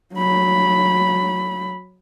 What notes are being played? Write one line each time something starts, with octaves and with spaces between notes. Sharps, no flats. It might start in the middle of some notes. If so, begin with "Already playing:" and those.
F#3 B5